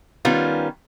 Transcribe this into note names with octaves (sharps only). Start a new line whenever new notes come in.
D#3 G3 B3 C#4 F4